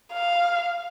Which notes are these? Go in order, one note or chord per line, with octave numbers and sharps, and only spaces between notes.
F5